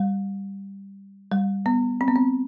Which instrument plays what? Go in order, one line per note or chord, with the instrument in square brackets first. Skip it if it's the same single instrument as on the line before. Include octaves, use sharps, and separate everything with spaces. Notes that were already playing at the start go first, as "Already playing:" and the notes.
Already playing: [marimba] G3
G3
B3
C4
B3
C4